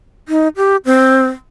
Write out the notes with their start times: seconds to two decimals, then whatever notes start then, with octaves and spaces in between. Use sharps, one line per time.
0.28 D#4
0.57 G4
0.85 C4